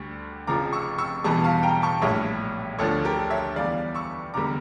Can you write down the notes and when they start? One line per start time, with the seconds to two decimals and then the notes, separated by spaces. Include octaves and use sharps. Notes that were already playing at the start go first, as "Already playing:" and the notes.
Already playing: D2 D3 G3 C#6
0.47 F1 F2 C#3 F3 A#5 D6
0.73 C#6 E6
0.98 C#6 E6
1.24 E1 E2 E3 G3 A5 C#6
1.44 F5 A5
1.63 G5 A#5
1.82 A5 C#6
2.02 A#1 A2 G3 C#5 E5
2.79 D2 D3 F3 A4 C#5
3.05 G4 A#4
3.30 C#5 E5
3.56 E2 E3 G3 D5 F5
3.94 C#6 E6
4.34 F1 E2 D3 G3 A#5 D6